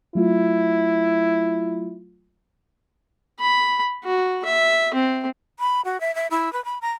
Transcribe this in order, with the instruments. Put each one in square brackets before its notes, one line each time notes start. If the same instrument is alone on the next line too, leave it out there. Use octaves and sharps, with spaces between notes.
[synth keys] F#3 A3 F4 [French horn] E4
[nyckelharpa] B5
F#4
E5
C4
[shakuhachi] B5
F#4
E5
E5
E4
B4
B5
A#5